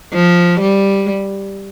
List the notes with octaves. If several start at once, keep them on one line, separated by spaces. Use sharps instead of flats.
F3
G3